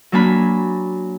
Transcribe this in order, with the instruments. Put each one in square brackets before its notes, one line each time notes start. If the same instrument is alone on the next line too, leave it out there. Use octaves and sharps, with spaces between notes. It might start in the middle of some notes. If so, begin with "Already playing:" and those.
[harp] F#3 A#3 D4 G#5 B5